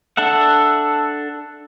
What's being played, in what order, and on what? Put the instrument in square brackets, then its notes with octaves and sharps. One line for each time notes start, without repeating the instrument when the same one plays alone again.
[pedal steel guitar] D4 A4 E5 F#5